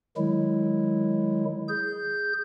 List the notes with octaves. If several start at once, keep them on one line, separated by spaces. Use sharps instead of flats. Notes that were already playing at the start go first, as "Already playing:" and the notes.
D#3 F#3 G#3 E4
G#4 G6